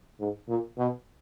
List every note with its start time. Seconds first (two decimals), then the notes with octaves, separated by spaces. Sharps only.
0.20 G#2
0.48 A#2
0.78 B2